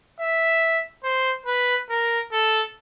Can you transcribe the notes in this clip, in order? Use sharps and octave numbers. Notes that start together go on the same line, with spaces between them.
E5
C5
B4
A#4
A4